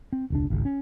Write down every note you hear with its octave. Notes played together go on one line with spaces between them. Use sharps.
C4
E1 C#2 D4
G#1 C#2
C#4